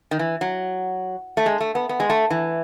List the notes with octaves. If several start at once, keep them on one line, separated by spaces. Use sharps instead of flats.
D#3
E3
F#3
A3
G#3
A3
B3
B3
G#3
A3
E3